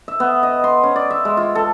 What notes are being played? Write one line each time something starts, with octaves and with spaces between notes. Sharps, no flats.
E5
B3
D#5
C6
C#4
D5
E5
G#3
F4
A4